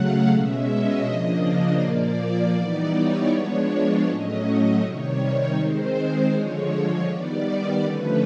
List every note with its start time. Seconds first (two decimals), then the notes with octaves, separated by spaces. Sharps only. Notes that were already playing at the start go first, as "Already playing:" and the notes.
Already playing: C#3 F#3 A3 F5 F#5
0.28 B2 G#3 C#4 E5
0.66 D#5
1.04 C#3 F3 A#3 D4
1.41 D#5
1.79 A#2 F3 A#3 D5
2.54 E3 G3 B3 D#4 D5
2.92 C#5
3.29 F3 G#3 B3 D4 C#5
4.05 A2 F#3 A3 C#4 D#5
4.80 C3 D#3 G3 C#5
5.55 D#3 G#3 C4 C5
6.30 D3 F3 G#3 C#5
7.05 D#3 G3 B3 D5
7.80 D3 F3 A3 C#4 B4